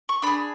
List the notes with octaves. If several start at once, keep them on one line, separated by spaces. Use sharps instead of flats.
C#6
D4 G#4 B5